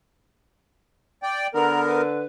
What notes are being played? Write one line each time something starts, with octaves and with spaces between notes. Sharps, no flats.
D5 G5
D3 B3 A#4 A#5
B4